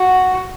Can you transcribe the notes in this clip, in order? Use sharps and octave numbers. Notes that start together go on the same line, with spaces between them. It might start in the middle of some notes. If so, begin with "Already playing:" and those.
Already playing: F#4